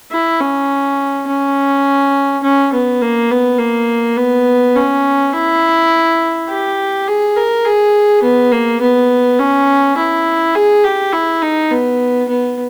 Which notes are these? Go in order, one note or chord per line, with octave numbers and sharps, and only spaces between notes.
E4
C#4
C#4
C#4
B3
A#3
B3
A#3
B3
C#4
E4
G4
G#4
A#4
G#4
B3
A#3
B3
C#4
E4
G#4
G4
E4
D#4
B3
B3